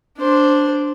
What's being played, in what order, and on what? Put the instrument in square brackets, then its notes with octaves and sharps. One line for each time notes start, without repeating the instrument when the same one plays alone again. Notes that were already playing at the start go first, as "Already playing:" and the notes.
[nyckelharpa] D4 C5